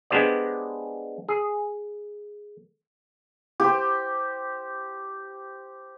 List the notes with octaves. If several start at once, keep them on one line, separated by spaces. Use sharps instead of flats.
G#3 B3 D4 G4 C5 D5
G#4
G4 C5